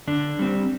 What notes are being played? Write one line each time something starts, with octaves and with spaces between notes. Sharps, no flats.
D3 D4
G3 C4